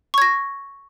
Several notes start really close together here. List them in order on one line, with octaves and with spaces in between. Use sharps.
C#6 G#6 A#6